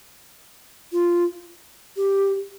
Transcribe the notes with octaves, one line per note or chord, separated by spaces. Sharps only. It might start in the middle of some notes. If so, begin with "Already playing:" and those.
F4
G4